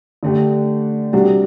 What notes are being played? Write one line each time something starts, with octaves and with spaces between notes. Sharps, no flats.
D3 A3 D4 G4
C3 G3 D4 F#4